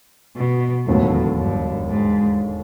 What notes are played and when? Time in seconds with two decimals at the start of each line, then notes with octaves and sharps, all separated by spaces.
0.37 B2
0.87 E1 D#2 A2 D3 F#3 B3
1.38 G2
1.89 G#2